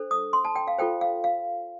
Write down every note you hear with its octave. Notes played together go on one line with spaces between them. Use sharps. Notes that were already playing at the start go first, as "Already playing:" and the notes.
Already playing: D4 A4 C5
D#6
C6
A5
G5
F5
F4 A4 C5 G5
F5
F5